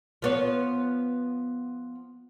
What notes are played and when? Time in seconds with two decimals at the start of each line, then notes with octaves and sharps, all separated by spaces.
0.22 F3 B3 C#5